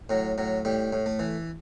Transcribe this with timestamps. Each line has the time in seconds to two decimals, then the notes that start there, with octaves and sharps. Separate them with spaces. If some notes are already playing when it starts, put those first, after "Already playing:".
0.09 A2 F#3
0.38 A2 F#3
0.65 A2 G3
0.93 A2
1.06 A3
1.19 E3